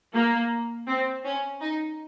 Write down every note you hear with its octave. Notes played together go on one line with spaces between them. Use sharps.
A#3
C4
C#4
D#4